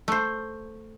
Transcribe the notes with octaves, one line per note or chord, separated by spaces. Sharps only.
A3 C5